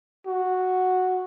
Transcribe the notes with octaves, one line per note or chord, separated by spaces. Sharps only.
F#4